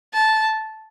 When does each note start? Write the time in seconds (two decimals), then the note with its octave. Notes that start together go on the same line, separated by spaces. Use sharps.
0.14 A5